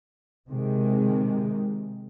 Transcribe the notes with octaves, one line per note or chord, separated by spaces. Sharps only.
C3 D#3 G#3